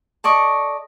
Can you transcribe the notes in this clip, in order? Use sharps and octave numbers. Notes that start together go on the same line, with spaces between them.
A4 D5 D#5 C#6